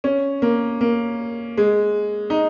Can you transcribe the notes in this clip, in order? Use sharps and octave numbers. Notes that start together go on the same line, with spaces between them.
C#4
A#3
A#3
G#3
D#4